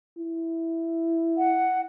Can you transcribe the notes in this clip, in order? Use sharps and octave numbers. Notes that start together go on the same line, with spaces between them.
E4
F#5